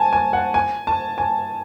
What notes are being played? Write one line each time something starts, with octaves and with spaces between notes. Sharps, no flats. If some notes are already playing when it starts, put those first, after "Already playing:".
Already playing: G#5 A5
G#5
F#5
G#5
A5
G#5